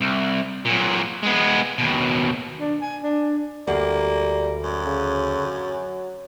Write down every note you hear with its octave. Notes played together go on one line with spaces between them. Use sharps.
C2
A#2 F#3
G#3 B3
D#2 B2
D4
G#5
D4
D2 G3 A#3
F#2
C#3
F#3